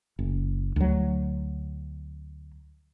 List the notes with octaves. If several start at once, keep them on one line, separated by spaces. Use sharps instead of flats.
F#1
D2 F#3